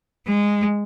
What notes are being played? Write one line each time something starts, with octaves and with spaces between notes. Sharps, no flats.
G#3